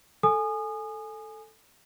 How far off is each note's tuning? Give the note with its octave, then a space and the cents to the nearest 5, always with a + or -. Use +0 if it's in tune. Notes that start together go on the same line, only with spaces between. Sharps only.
A4 +0 G#5 +5 D#6 -25